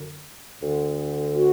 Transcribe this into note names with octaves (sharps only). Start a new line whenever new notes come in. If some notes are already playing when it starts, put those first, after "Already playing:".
Already playing: F#2 D3
D2 D3
F#4